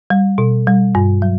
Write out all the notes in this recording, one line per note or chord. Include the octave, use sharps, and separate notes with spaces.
G3
B2
G3
G2
F#3